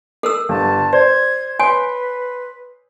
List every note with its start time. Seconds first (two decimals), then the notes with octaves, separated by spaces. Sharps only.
0.23 A4 A#4 E6
0.49 G1 A5
0.93 C5 D5 G#6
1.60 B4 C#5 G#5 C6